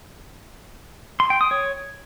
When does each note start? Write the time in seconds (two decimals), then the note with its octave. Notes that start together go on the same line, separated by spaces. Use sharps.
1.20 C6
1.30 G5
1.41 D#6
1.51 C#5